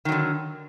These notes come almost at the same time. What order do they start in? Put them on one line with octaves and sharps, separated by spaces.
D#3 F#3 D3